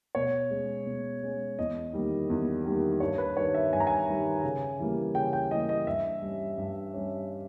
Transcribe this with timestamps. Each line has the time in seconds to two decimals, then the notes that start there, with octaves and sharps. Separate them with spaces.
0.15 B2 C#5
0.51 G#3 C#4
0.86 B2
1.23 G#3 C#4
1.59 E2 D#5
1.93 D#3 G3 A#3
2.30 E2
2.65 D#3 G3 A#3
3.00 G2 C#5
3.18 B4
3.37 D#3 G3 C#5
3.54 E5
3.73 G2 G#5
3.80 A#5
3.87 G#5
4.09 D#3 G3
4.43 C#3
4.79 E3 G3 A#3
5.15 C#3 G5
5.33 G5
5.51 E3 G3 A#3 D#5
5.69 D#5
5.87 G2 E5
6.22 G3 C#4
6.58 G2
6.94 G3 C#4